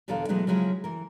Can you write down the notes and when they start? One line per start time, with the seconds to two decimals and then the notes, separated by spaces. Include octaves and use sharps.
0.08 E2 B2 D3 A4 A#4 F5
0.29 B2 E3 F#3 G#3 A3
0.47 C#3 F3 F#3 G#3 E4
0.84 E3 A#4